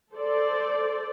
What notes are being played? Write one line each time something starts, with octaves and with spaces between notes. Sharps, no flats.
A4 C5 D5